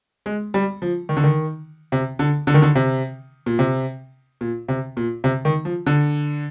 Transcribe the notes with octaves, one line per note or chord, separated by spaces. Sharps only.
G#3
G3
F3
D#3
D3
D#3
C3
D3
D3
D#3
D3
C3
A#2
C3
A#2
C3
A#2
C3
D#3
F3
D3